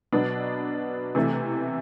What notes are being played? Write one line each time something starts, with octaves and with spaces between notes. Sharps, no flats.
B2 F#3 B3 D4
C3 E3 A3